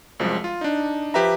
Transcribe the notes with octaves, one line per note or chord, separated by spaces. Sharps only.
C2 F#2 F3 G#3
F4
D4 D#4
F3 G4 B4 E5 A#5